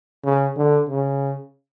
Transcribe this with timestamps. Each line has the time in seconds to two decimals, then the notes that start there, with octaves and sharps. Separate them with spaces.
0.25 C#3
0.57 D3
0.89 C#3